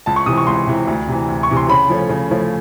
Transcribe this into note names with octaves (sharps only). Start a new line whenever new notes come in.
C#2 A5
C#6
C3 E3 D#6
C#6
C#2 C6
C3 E3
D2
C3 E3
D2
C#6
C3 E3
C6
C#3 B5
F3 A3 C#4
C#3
F3 A3 C#4